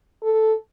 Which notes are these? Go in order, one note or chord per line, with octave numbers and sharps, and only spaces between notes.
A4